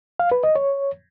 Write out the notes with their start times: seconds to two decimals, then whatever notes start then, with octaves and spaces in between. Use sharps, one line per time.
0.20 F5
0.32 B4
0.44 D#5
0.55 C#5